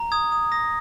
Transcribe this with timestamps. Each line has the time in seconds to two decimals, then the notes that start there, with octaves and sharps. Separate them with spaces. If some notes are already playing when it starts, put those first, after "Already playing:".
Already playing: A#5
0.12 D#6 G#6
0.32 D#6
0.52 D#6 A#6